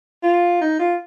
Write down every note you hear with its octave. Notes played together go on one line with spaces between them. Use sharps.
F4
D#4
F4